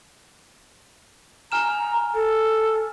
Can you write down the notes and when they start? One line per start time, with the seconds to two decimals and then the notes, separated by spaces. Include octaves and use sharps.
1.52 G#5 A#5 F6 E7
2.14 A4